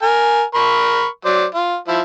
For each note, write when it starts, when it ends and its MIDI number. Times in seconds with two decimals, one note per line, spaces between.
0.02 0.43 70
0.02 0.43 80
0.55 1.07 70
0.55 1.07 83
0.55 1.07 85
1.25 1.45 54
1.25 1.45 72
1.25 1.45 74
1.54 1.77 65
1.88 2.01 53
1.88 2.01 64